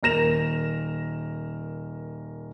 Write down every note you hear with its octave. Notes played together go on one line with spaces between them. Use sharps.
D#1 A#4 A#6 E7 F7